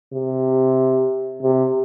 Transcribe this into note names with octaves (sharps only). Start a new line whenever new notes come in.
C3
C3